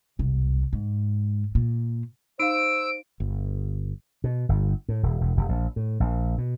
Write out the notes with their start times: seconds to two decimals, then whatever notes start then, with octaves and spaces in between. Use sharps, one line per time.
0.19 E1 C2
0.73 G#2
1.55 A#2
2.40 D#4 C5 F5 E6 D7
3.20 G1
4.24 B2
4.49 G1
4.89 A2
5.03 D#1
5.21 E1
5.37 F1
5.49 A#1
5.76 A2
6.00 A#1
6.38 B2